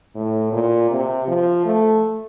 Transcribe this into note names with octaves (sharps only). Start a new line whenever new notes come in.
A2
A#2
C3
F3
A3